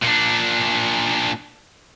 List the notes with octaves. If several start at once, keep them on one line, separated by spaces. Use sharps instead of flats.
A#2 D4